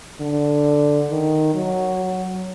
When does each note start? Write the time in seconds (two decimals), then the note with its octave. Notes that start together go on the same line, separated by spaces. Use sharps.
0.21 D3
1.10 D#3
1.55 F#3